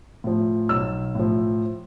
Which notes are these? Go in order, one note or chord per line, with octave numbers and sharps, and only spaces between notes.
A2 F3
B1 E6
A2 F3